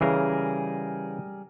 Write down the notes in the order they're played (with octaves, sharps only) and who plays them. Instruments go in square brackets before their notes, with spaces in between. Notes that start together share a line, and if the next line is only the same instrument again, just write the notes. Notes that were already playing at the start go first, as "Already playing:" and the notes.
[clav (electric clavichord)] C#3 E3 [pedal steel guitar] G3 G#4 A#4